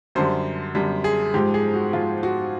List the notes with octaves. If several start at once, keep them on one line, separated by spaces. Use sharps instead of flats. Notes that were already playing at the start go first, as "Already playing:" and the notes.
F#2 D3 G3 C5
F#2 D3 G3
G#4
G#2 F3 G#3 G4
G#4
F#4
G#2 F3 G#3 F4
F#4